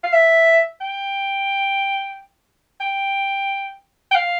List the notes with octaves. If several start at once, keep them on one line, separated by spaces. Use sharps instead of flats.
F5
E5
G5
G5
G5
F5